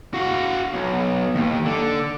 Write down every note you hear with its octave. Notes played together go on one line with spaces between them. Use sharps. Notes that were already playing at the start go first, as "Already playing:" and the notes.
F#4 F5
B1
D#2
D3